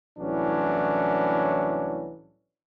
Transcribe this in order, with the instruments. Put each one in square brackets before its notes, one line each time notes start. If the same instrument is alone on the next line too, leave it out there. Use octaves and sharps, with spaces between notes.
[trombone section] C2 A2 E3 F#3 C#4 D4